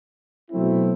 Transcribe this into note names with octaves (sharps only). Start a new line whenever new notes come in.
B2 F#3 A3 C4 E4